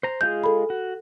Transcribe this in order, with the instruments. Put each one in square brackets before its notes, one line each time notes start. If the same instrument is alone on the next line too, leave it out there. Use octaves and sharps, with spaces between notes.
[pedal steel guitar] C5 A#5
[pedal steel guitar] G#3 F4 G#4 [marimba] G6
[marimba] A4 B5
[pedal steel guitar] F#4